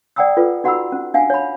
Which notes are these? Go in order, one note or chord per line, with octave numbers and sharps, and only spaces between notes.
D5 F#5 G5 A#5 D#6 E6
F4 A4 B4
D#4 F#4 F#5 A#5 B5 E6
C#4
D4 F5 F#5 G#5
C#5 B5